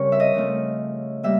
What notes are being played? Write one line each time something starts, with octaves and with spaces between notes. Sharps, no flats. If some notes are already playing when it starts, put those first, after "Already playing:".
Already playing: C#3 G3 C4 A#4 C#5
E5
D#5
C#3 F3 A3
G3 A#3 E5